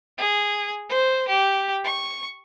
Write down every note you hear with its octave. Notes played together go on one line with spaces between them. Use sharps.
G#4
C5
G4
C#6